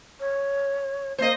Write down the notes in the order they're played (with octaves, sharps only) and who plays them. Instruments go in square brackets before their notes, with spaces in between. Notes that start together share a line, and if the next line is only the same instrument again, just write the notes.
[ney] C#5
[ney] A#3 [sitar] C5 D#5